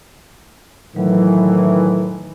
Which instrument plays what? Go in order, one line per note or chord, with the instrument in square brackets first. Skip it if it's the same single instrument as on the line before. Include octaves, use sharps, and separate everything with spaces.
[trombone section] A2 D#3 E3 [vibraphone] F#3